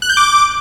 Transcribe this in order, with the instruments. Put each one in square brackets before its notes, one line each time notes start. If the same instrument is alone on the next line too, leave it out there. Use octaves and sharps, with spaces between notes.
[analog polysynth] F#6
G6
D6